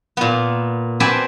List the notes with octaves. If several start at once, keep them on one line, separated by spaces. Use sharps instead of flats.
A#2 B3
C4 F#4 B4 D5 G#5 A5